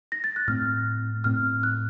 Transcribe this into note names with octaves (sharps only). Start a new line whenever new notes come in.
A#6
A6
F#6
A2 A3 C4 F6
A2 A3 C4 F6
F#6